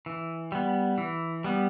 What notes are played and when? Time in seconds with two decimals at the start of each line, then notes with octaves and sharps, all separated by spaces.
0.06 E3
0.52 G3 B3
0.98 E3
1.44 G3 B3